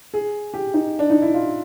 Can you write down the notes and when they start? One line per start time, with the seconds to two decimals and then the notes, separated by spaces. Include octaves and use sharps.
0.14 G#4
0.54 G4
0.74 D#4
0.99 D4
1.10 D#4
1.22 E4
1.34 F4